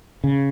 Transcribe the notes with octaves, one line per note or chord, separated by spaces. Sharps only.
C#3